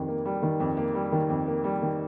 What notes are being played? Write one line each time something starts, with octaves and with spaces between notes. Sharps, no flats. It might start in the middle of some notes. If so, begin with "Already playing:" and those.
Already playing: F2 D#3 G3
A#3
G3
D#3
F2
A#3
G3
D#3
F2
A#3
G3
D#3